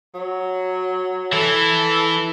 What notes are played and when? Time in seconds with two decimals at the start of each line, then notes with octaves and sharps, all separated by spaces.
0.14 F#3
1.33 E3 E4 A4